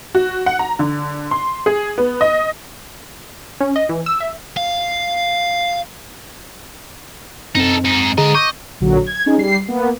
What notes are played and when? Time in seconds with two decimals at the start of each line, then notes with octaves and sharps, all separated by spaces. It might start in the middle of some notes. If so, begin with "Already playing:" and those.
0.15 F#4
0.46 F#5
0.59 A#5
0.79 D3
1.31 C6
1.66 G#4
1.98 B3
2.21 D#5
3.60 C#4
3.76 D#5
3.89 E3
4.06 E6
4.20 E5
4.57 F5
7.55 F#2 C4 D#4 A4
7.84 G#2 D#4
8.18 G#2 D3 G#4 D#5 A#5
8.35 D#5 C#6 D6 G6
8.81 A#1 D3 F#3
9.06 G#6
9.26 C#4 D#4 G#4
9.38 G3 C7
9.68 A#3 B3